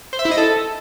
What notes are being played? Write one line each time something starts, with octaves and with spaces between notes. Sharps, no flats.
C5
E5
E4
D#5
A4